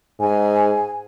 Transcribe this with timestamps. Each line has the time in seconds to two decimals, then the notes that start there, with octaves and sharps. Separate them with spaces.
0.20 G#2 G#5